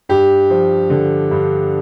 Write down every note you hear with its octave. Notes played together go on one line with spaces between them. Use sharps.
G2 G4
F3
D3
G2